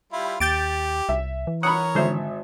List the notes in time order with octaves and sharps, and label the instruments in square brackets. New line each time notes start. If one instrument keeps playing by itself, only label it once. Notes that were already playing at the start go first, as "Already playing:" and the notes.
[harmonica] G3 E4 F4
[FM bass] D#2 [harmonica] G4 [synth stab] G6 A6 D7
[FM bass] C2 [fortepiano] E5
[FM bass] E3
[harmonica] A#4 C#5 [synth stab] F#5 [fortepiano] B5 D#6
[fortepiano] G#1 E5 [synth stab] D3 C5